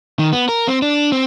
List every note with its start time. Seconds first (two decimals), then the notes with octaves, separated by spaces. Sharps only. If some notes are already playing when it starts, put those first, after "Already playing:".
0.19 D#3
0.33 B3
0.49 A#4
0.68 C4
0.82 D4
1.12 C4